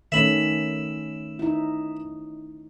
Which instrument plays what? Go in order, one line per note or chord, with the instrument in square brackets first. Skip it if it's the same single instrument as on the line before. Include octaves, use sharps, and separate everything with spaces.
[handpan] D#3 A3 C#4 [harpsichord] E5 B5
[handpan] D#4 E4